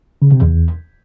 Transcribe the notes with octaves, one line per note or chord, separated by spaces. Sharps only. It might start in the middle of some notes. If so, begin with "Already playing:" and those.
C#3
C3
E2